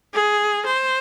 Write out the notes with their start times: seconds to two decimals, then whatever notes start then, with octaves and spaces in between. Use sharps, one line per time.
0.14 G#4
0.66 C5